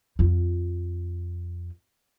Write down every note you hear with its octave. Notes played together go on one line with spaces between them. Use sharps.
F2 F4